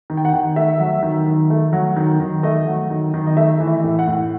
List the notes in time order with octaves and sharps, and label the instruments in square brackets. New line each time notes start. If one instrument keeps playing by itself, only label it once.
[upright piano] D#3
G5
F#5
D#3
A3 E5
F#3
D#3
D#3
A3
F#3
D#3
D#3
A3 D#5
F#3
D#3
D#3
D#5
A3 E5
E3
E5
A2
F#5
A2